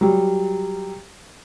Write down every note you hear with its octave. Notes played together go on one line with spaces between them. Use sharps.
F#3 G3